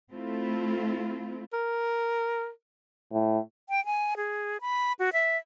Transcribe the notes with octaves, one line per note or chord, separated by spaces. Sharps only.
A3 C4 E4 F4
A#4
A2
G5
G#5
G#4
B5
F#4
E5